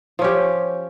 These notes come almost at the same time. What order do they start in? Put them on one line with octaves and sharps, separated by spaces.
F3 C#4 G4